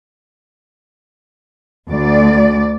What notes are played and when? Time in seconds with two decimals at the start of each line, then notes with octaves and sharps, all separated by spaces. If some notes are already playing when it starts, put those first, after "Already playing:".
1.90 D2 D5